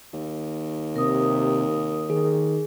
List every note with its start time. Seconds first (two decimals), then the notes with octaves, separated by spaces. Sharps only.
0.13 D#2
0.96 C3 A#4 D#6
2.10 D#3 G#4